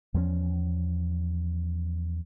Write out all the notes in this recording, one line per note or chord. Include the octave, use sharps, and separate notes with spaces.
E2 F3 F#3 C#4